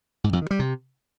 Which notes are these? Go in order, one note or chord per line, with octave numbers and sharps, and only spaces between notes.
G#2
F2
D#3
G3
C3